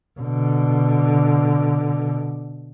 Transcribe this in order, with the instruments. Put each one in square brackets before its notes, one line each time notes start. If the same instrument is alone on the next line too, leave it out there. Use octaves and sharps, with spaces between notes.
[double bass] B2 D3